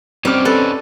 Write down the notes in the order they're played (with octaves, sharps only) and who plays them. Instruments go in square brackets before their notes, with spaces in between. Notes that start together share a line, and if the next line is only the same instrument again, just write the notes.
[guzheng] G3 [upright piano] C4 F6 [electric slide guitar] C#4 D#4 C5 [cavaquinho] G4 D6
[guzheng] A4 [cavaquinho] B4